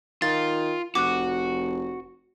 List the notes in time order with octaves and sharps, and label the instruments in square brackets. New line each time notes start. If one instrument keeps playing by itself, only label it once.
[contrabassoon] D#3 [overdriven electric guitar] F4 [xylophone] A6
[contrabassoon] F1 [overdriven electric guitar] F#4 [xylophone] D6 F#6